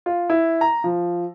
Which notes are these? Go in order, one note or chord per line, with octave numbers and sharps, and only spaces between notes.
F4
E4
A#5
F3